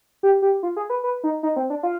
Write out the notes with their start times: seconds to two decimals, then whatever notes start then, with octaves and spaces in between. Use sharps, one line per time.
0.23 G4
0.42 G4
0.63 F4
0.76 G#4
0.90 B4
1.04 B4
1.24 D#4
1.43 D#4
1.56 C4
1.70 D4
1.83 F4